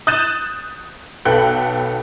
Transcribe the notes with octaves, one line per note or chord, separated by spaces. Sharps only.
D#6 F#6 G6 A6 D#7 E7
B1 A4 B4 F#5 G5 F#6